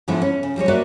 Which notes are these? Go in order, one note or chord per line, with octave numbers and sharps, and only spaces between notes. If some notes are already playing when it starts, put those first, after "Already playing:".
G#2 D3 F3 G#3 B3 E4
C#4
C#3
F3 G3 G#3 C#5
A#3 F#4 B4 C#5 D5 E5